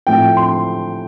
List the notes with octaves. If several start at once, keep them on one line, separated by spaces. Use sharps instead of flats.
A2 F3 A3 C4 G5
C6